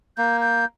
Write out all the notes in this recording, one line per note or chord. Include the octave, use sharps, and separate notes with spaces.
A#3 G6
G6